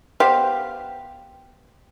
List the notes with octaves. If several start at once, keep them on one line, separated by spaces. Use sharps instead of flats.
B3 G4 C5 F5